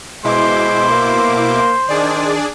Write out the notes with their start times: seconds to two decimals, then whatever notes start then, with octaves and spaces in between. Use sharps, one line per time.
0.24 B2 G#3 E4 C5 C6 D6
0.89 A#3
1.89 D#3 D4 G#4 D5